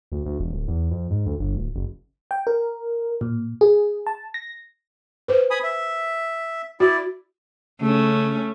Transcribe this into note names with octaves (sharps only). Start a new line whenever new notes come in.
D2
D2
E1
D1
E2
F2
G#2
D2
G1
D1
F#1
G5
A#4
A#2
G#4
A5
A#6
B4 C5
G#5 B5 D#6
E5
E4 F#4 D5
C#3 A3 C#4